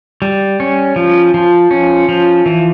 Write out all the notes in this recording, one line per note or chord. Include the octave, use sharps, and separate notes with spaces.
G3
C#4
F3
F3
C#4
F3
E3